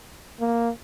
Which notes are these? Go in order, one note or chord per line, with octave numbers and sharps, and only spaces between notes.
A#3